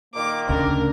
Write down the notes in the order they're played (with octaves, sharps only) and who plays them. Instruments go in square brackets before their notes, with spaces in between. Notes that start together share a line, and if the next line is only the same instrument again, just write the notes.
[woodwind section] A#2 D#3 A#3 [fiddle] D6
[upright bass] D2 A2 [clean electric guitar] C#3 D4 [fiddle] A#4